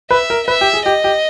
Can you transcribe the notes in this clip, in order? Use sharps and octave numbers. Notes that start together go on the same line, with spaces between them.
B4 E5
A#4
B4 E5
G4
G#4
G4 D#5
G4